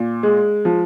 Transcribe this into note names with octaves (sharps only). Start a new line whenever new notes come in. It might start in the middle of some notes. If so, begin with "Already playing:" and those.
Already playing: A#2
G#3
F3